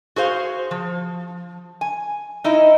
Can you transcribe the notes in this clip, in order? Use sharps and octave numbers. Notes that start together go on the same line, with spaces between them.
F#4 G#4 C5 F5
F3
G#5
D#4 E4 D#5